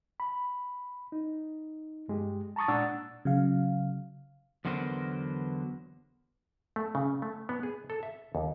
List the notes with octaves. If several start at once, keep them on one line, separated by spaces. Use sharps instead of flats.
B5
D#4
G2 G#3 G4
A5 A#5 C#6 D#6 A6
A#2 G#3 D4 F#5 E6 A6
C#3 F#3 F5
E2 D3 F#3 B3 A#4 C5
A3
C#3
A3
B3
G#4
A4
E5
D#2